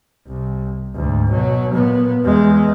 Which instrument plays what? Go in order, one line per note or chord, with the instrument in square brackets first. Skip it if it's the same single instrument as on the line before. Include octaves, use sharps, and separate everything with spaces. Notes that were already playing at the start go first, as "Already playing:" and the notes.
[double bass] C2
D2 G#2
B2 F#3
A#2 B3
E2 G#3